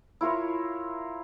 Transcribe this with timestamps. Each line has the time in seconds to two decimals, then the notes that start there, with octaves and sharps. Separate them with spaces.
0.21 E4 F4 A#4 C#5